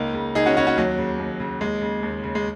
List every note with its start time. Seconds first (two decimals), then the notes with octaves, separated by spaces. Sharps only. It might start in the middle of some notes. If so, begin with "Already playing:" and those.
Already playing: C#2 A#3 D#4
0.14 C#3
0.35 C#2 D#4 G#4
0.46 C#4 F#4
0.56 C#3 C#4 F#4
0.67 C#4 F#4
0.78 D#2 F#3
0.98 C#3
1.19 D#2
1.40 C#3
1.61 D#2 G#3
1.82 C#3
2.03 D#2
2.24 C#3
2.35 G#3